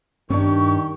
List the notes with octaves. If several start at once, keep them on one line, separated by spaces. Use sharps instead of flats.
G2 D#3 C4 D4 G4 C#6